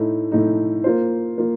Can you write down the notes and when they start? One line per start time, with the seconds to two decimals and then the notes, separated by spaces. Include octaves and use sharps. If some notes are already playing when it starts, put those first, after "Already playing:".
Already playing: A2 A3 D#4
0.32 A2 A3 D#4
0.84 A#3 F4 C5
1.38 A#3 F4